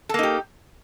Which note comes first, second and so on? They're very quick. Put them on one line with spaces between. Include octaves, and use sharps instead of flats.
A4 A#3 D#4 G4